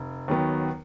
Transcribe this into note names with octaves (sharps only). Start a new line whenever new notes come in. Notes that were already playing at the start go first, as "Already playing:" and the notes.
Already playing: F1
D#2 D#3 F#3 B3